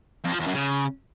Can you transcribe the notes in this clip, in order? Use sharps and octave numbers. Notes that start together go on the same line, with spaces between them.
F2
F3
E2
F#2
C#3